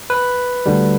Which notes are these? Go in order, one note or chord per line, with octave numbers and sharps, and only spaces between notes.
B4
D2 D3 G3